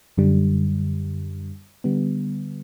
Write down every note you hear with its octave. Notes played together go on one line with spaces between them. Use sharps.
F#2 D3 G3
D3 G3 B3